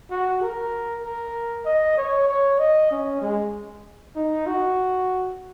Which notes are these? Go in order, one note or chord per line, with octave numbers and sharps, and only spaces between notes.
F#4
A#4
A#4
D#5
C#5
C#5
D#5
C#4
G#3
D#4
F#4